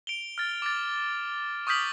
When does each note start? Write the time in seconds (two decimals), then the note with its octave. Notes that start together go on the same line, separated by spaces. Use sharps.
0.07 D7 F7 G7
0.38 F6 A6
0.62 D6 A6
1.67 C#6 D#6 F6 G6 B6 F#7